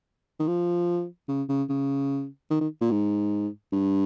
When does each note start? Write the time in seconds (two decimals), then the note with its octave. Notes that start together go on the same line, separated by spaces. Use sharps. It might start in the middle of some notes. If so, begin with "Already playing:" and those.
0.40 D#3
0.48 F3
1.29 C#3
1.49 C#3
1.69 C#3
2.51 D#3
2.61 D#3
2.81 A#2
2.91 G#2
3.73 G2